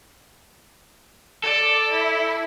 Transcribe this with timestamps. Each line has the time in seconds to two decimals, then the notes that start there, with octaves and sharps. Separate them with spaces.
1.44 A4 D5
1.91 E4